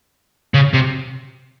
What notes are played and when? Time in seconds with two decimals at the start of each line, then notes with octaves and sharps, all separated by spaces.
0.54 C#3
0.73 C3